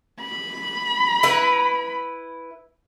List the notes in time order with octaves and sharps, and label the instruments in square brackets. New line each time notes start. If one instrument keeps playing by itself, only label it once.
[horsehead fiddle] B5
[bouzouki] E4 B4